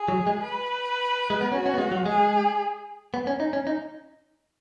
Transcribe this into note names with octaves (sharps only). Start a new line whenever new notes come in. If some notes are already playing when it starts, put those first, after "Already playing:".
Already playing: G#4
F#3
G#3
B4
G#3
B3
C#4 F#4
C#4
B3
G#3
F#3
G#3 G#4
B3
C#4
D#4
C#4
D#4